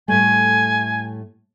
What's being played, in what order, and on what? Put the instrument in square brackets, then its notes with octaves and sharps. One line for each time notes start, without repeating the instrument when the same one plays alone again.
[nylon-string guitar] A2 G3 A3 [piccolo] G#5